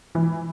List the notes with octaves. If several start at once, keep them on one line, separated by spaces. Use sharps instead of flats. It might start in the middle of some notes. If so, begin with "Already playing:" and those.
E3